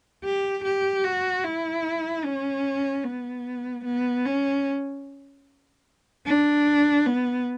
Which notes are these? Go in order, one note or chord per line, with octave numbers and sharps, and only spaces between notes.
G4
G4
F#4
E4
C#4
B3
B3
C#4
D4
B3